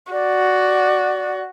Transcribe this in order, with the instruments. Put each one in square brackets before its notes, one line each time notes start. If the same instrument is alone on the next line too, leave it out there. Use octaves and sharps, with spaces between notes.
[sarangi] F#4 [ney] D5